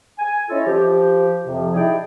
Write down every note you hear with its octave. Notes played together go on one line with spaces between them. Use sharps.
G#5
C#4 E4 F4 A4 C#5 D#5
F3 G4
F2 C3 F3
D#4 E4 G4 G#4 D5 G5